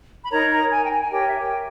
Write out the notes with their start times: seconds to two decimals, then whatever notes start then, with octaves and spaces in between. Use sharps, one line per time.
0.22 B5
0.31 D#4 A#4 C#5 A#5
0.51 A#5
0.70 G#5
0.83 G5
0.90 G#5
1.01 G#5
1.10 G4 A#4 C#5 G5
1.26 E5
1.37 G5